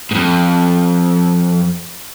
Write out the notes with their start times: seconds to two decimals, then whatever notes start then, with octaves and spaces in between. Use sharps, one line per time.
0.11 F2 G#2